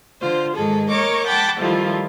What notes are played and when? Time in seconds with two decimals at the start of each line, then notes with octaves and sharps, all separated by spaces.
0.20 D3 F4 C5
0.56 G#2 D#3 G#4 A4
0.89 A#4 C#5 D#5 C#6 D6
1.27 F#5 G5 A5 B5 D6
1.60 D#3 F3 G3 A3 E4 F4